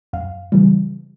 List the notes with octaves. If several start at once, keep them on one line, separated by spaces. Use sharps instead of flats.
F#2 F5
C#3 E3 G3